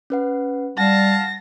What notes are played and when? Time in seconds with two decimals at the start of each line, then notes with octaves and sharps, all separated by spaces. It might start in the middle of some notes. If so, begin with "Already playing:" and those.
0.10 C#4 B4 F#5
0.78 G3 F5 F#5 A5 A#6